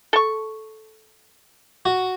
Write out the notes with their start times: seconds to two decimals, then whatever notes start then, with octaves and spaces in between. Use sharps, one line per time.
0.13 A4 C#6
1.85 F#4